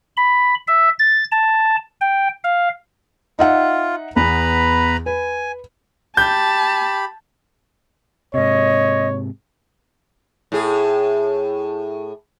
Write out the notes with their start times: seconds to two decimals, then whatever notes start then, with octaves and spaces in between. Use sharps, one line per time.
0.17 B5
0.67 E5
0.99 A6
1.32 A5
2.01 G5
2.44 F5
3.39 D#4 F4 E5 F#5
4.16 E2 B3 B4 A#5 B5
5.06 B4 G#5
6.17 G4 A5 B5 G6
8.34 G#2 C3 C#5 D#5
10.52 A2 G#4